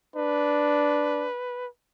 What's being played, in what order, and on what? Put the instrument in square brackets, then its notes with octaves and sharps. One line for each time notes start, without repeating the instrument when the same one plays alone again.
[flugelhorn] D4 [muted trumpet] B4